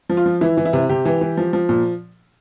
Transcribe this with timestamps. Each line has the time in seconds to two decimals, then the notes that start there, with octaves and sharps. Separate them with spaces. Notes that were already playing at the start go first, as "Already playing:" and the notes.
0.10 F3
0.17 F4
0.26 F3
0.41 E3 E4
0.57 E3
0.65 E4
0.73 C3
0.89 C3 G4
1.05 E3
1.21 E3
1.37 F3
1.53 F3
1.69 A#2